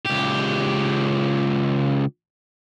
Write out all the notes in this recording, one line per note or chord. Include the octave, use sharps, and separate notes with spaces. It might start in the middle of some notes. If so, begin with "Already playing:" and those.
C#2 G4